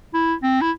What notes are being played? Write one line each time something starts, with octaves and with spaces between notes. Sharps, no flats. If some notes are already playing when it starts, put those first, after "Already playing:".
E4
C4
E4